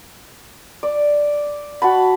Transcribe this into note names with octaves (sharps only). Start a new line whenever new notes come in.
D5
F#4 A5 B5